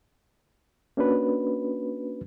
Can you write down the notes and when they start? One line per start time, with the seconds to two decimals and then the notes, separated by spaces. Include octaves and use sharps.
0.97 A#3 C#4 D4 F#4 B4